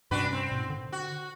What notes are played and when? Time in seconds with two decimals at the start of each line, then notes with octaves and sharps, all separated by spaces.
0.11 G2 C3 C#4 D4 F#4 B4
0.33 C4
0.52 G#2 B2
0.69 D3
0.92 F#4